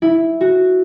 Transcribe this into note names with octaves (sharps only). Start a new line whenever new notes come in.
E4
F#4